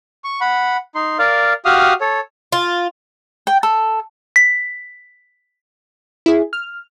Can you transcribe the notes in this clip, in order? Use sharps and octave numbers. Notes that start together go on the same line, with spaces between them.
C#6
F#5 B5
D#4 C6
A#4 D5 F5
F#4 G4 F5 D#6 F6
A4 C#5
F4
G5
A4
B6
E4 G#4
F6